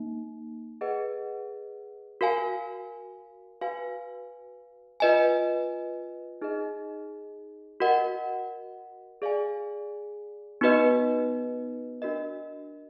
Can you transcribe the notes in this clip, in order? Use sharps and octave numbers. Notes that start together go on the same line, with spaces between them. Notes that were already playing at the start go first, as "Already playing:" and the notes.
Already playing: A#3 D#4
G#4 B4 D#5 F#5
F#4 A#4 F5 G#5
F#4 B4 F5 G#5
F4 B4 D#5 G#5
D#4 G#4 D#5
F#4 A#4 D#5 F#5
G#4 D5 F5 G#5
B3 D#4 F#4 B4 D#5
D4 F#4 A#4 D#5